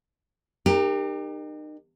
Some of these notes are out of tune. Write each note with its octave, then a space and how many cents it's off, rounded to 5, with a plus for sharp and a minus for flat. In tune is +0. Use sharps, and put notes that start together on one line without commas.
D#4 -35 G4 +25 A#4 +0